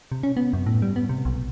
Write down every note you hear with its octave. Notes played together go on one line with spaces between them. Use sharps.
C3
C#4
B3
F#2
A2
G3
B3
C3
B1